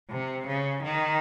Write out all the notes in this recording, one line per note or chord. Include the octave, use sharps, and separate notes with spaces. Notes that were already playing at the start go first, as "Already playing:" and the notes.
C3
C#3
D#3